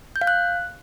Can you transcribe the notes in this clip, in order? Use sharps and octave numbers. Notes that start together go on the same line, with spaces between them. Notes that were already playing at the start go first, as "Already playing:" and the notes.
G6
F5
F#6